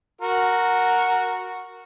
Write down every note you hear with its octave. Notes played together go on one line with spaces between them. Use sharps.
F#4 A#4